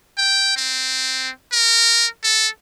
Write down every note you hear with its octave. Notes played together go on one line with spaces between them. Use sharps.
G5
C4
A#4
A4